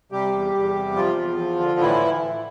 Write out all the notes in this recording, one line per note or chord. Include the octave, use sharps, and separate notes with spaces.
C3 G3 G4
E2
E2
C3
F3 F4
E2
F3
D3
A2 E3 E4